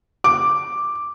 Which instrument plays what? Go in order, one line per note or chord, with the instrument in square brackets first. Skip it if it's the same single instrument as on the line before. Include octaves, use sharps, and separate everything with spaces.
[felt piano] D6